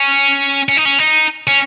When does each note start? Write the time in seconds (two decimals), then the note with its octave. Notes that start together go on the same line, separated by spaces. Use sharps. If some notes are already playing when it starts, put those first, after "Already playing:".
Already playing: C#4
0.69 C#4
0.77 D#4
0.85 C#4
0.99 D#4
1.47 C#4